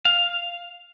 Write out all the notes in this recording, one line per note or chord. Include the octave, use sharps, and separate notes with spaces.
F5